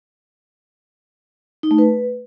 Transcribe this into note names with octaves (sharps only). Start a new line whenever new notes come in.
D#4
A3
B4